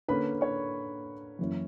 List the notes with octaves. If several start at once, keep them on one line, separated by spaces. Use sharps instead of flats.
D3 A#3 C#4 B4 B5
C#5 C#6
F#2 E3 A#3 C#4